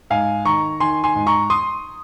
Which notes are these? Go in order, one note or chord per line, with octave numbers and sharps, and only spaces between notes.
G#2 F5 G#5
D#3 A#5 C#6
D#3 G#5 C6
G#5 C6
G#2
A#5 C#6
C6 D#6